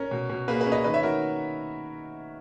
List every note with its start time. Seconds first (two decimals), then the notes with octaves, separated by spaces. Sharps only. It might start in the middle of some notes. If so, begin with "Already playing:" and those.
Already playing: C#4 A#4 C#5
0.11 B2
0.30 B2
0.48 A#3 G#4 B4
0.60 G#4 B4
0.66 C#4
0.72 B4 D#5
0.84 D#3 B4 D#5
0.94 C#5 E5
1.03 D#3 F#4 A#4